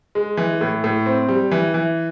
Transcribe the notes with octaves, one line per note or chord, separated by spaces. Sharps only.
G#3
E3
A2
A2
C4
G3
E3
E3